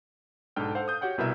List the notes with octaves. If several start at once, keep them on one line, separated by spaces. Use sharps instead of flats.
B1 G#2 D4 A4 G5 F6
A4 C5 F5 F#5
D#6 G6
F#4 G4 C#5 F#5 G5
C2 B2 E4 A#4 E5